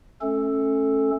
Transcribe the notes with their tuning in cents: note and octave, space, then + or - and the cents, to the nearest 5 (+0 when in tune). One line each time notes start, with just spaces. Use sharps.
A3 -25 C#4 -20 A4 +0